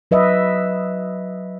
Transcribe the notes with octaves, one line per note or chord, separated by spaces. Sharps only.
F#3 B4 D#5 E5